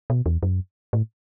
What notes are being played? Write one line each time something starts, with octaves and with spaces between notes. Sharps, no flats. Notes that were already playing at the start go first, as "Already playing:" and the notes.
B2
E2
F#2
A2